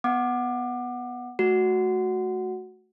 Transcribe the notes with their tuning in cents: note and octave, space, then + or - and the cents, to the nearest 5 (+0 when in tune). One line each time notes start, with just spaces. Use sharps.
B3 +0 F#5 +0 D6 +25
A3 -20 F#4 +0 F#5 +0